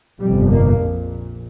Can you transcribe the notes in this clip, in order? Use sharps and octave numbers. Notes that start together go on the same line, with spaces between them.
G1 F2 C3 G3
A#3
A#1 A#2